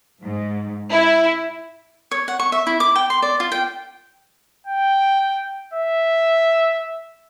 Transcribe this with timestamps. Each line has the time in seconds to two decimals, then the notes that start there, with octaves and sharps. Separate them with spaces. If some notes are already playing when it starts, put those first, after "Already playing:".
0.23 G#2
0.91 E4
2.11 C#5
2.28 F#5
2.40 C#6
2.52 E5
2.67 E4
2.80 D6
2.96 G5
3.10 C6
3.22 D5
3.40 F4
3.52 G5
4.67 G5
5.74 E5